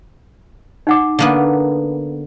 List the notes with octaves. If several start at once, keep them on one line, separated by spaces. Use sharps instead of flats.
D#4 F#5 D6
D3 A#3 B3